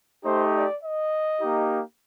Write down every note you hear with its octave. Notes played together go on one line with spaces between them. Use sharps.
A3 D#4 G4 C5
D5
D#5
A#3 D#4 G4